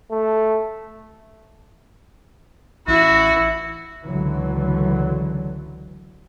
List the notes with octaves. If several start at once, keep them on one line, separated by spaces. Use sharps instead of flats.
A3
A1 E4 F#4
C#2 D3 E3 F#3